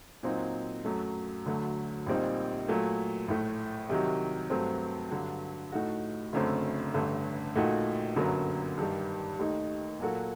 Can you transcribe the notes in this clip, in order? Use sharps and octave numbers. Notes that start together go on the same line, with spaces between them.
A#2 F#3 C4 D#4
F#2 F#3 A3
D2 D3 F#3 A3
A#1 A#2 G3 C4 D#4
A#2 F#3 A3
A#1 A2 A3
C2 C3 D#3 F#3
G2 F#3 A3 C4
G2 D3 F#3
A2 A3 D#4 F#4
F#1 F#2 D3 A3 C4
A1 G2 D3 A3
A#1 A#2 A3 D#4 F#4
G1 F#2 D3 F#3 A#3
G2 D#3 G3
D#2 D#3 A3 D#4
A#2 F#3 A#3 F#4 A4